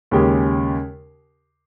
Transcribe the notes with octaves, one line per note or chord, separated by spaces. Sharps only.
D#2 C#3 G#3 C#4 G4